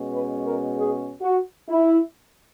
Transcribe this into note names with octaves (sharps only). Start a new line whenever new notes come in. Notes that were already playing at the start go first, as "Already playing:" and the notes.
Already playing: B2 G#3 C#4
B4
A#4
G#4
F#4
E4